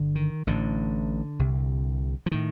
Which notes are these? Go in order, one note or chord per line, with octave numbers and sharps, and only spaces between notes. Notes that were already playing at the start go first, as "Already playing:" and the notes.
Already playing: G1 D3
D#3
A1 A2 D3
C2 C3
F3
A2 D#3